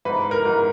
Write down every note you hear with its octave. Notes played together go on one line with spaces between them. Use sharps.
G#2 B4
A#4
G#2